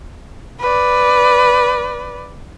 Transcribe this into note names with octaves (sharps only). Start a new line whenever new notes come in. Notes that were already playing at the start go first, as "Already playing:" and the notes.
B4 D5